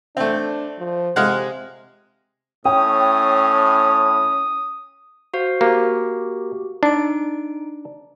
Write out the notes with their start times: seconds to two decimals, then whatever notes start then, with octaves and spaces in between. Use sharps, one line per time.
0.17 A3 C4 D4
0.79 F3
1.16 C3 G#3 F5 F#5
2.65 A2 C#4 G5 D#6
5.34 F#4 C5 F5
5.61 A#3 F#4 G4
6.83 D4 D#4 D7